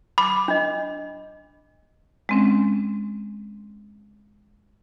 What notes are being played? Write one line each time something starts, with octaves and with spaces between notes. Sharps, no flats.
B5 D6
D4 D#5
G#3 C4 C#4